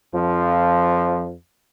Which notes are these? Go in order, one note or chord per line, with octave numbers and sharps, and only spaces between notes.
F2 F3